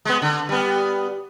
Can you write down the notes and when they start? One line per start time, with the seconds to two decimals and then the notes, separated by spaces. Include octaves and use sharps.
0.05 G#3 B3
0.22 D3
0.49 G3 B3